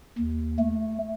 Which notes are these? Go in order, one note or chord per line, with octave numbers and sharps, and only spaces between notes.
D#2
A3